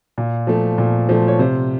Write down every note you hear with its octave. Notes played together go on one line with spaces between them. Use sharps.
A#2
F3 A3
A#2
F3 A3
C#5
C3 C5